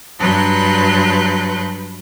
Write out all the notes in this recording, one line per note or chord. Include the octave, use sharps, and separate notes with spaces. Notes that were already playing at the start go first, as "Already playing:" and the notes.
G2 F#3 B4 C6 F#6 G6